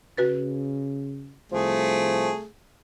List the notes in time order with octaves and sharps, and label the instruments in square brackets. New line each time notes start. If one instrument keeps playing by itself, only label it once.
[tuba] C#3 [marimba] F#4 B4 A6
[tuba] C2 [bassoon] F3 [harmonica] A3 G#4